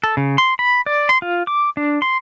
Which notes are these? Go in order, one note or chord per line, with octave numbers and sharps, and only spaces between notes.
A4
C#3
C6
B5
D5
C6
F4
D6
D4
C6